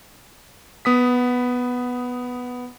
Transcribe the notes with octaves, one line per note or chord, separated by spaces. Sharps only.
B3 D#6 B6